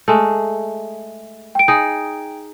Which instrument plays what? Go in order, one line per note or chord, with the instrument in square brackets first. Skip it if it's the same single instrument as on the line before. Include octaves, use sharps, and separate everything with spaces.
[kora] G#3 A3
[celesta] G5 D7
[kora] D#4 G#4